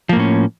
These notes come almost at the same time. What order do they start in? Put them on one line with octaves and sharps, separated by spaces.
F3 A#3 A2 C#4